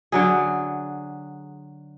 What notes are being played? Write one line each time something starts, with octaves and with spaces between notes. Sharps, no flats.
D3 F#3 G#4